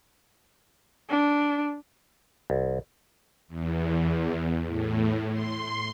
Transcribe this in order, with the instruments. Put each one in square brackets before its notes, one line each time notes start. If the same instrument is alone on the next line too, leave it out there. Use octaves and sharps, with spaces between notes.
[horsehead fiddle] D4
[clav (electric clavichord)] C2
[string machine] E2
A2
C6